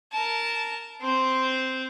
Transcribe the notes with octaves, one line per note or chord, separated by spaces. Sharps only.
A#4 A5
C4 C5